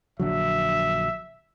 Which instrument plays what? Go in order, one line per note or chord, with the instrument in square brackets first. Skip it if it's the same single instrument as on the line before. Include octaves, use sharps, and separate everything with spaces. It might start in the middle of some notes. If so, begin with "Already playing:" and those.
[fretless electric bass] A#1 D3 F#3 [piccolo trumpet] E5